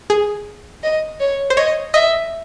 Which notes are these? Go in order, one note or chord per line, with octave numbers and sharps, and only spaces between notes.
G#4
D#5
C#5
C5
C#5 D#5
D#5 E5